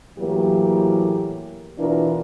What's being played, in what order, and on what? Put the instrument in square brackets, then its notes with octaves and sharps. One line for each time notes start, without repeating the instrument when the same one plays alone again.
[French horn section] A2 E3 F#3 A#3 G4 A#4
B2 E3 D4 F4 A#4